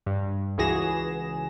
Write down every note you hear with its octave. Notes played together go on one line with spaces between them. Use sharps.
G2
C#2 E3 F#4 G#4 A#6 E7